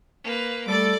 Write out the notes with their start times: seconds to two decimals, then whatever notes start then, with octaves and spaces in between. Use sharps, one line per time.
0.24 A#3 B4
0.68 G3 A3 A4 D5 D6